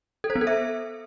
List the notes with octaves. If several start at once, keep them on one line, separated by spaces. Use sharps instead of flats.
A4
C5
B3
A4
E5